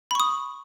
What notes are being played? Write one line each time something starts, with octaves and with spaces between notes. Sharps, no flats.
B5 C#6 D#6